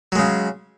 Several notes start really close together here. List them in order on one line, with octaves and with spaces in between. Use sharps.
F#3 G#3 C#3